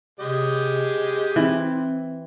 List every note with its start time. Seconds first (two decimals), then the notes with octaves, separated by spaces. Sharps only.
0.20 C3 G#3 G4 D#5
1.36 E3 C4